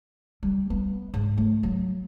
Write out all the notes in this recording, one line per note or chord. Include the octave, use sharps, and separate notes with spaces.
G3
B3
G#2
A3
F#3